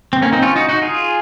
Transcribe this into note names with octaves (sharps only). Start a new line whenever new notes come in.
C4
A#3 C#4
C4 D#4
C#4 F4
D#4 F#4
D#4 F#4
F4 G#4